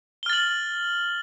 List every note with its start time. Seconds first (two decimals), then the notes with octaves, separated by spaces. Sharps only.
0.23 G7
0.26 F6
0.30 A6
0.33 F#7